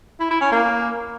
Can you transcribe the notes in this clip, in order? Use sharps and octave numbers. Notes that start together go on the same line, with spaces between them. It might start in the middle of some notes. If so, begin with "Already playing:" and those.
E4
E4
C#4
A#3